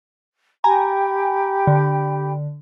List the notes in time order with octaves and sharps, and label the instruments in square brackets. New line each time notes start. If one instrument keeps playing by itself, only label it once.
[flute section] G4 G5 B5 [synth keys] G#5 A#5
[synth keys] D3